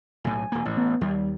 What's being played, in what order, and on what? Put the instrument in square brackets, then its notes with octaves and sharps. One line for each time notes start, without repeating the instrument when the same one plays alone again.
[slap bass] B1 A2 [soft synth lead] G#5
[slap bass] E1 A#3
[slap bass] A1 [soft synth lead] A2
[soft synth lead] B3
[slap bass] D#2 [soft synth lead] G3